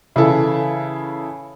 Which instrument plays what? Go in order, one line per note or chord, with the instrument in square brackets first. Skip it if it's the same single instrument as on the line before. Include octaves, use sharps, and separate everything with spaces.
[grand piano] C#3 E3 E4 A4